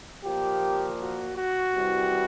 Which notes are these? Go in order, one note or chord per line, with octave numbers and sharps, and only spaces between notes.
A#2 F3 A#3 G4
F#4
F#4
C2 C3 E3 G3